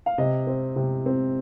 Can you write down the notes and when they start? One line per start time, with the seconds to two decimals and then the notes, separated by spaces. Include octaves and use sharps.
0.06 F5
0.18 C3 D#5
0.47 C4
0.76 C3
1.06 C4